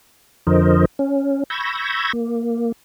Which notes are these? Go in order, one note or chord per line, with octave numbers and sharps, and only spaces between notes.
F2 D3 F3 A#4 C5 D#5
C#4
B5 C#6 E6 G6 G#6 A#6
A#3